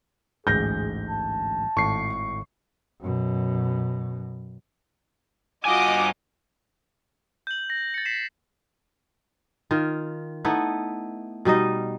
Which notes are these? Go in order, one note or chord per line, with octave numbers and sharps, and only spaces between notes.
A1 D2 G#2 G#4 G6 A#6
A5
G#1 A2 C#6 C7
F#2 B2
G2 F4 F#4 D#5 G#5 D6 D#6
G6 F#7
A#6
A6 C#7
B6 C7 E7
D#3 F4
A3 B3 D#4 E4
B2 G3 D#4 D#5